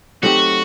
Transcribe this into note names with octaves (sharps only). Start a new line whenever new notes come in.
F#3 A3 C4 D#4 F#4 G4